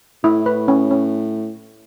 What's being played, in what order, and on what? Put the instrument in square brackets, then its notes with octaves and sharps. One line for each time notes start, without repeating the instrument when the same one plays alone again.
[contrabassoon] A2 [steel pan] E4
[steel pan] B4
C#4
C#4